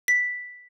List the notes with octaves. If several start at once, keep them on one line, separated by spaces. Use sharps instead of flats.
B6